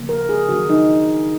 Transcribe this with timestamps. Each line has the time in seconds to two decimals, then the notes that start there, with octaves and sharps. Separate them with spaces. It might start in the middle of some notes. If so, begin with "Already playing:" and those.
Already playing: C#3 F3 A#3
0.09 A#4
0.29 G#4
0.49 D#3 F#3 A#3 D4 F#4
0.70 D#4